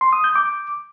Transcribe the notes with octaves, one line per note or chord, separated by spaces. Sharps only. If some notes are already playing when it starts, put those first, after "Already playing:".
C6
D#6
G6
D6